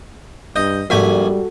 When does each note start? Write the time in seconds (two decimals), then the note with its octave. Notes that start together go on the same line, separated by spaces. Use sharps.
0.56 G2 D#5 G6
0.90 A#1 G#2 G3 F#4 G4 A4 G#5 B6